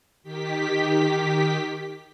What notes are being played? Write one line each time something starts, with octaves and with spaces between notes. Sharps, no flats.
D#3 G4 B6